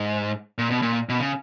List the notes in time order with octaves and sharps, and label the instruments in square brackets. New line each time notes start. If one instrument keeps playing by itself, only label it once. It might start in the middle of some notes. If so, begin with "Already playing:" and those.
Already playing: [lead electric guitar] G#2
A#2
B2
A#2
B2
C#3